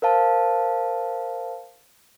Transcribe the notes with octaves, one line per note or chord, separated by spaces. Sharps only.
A#4 C5 F5 A5